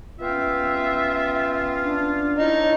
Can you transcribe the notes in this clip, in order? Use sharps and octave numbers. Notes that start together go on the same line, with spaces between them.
B3 C#4 F4 E5 G5
D4
D#4 E4 C#5